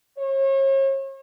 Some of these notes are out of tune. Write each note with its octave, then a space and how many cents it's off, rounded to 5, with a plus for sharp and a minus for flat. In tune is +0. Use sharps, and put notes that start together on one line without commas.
C#5 -40